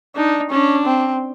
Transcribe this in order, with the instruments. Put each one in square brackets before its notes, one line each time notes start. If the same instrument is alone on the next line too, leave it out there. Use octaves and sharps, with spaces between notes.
[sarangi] D4 [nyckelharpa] D#4
[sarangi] C#4 [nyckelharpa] D4
[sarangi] C4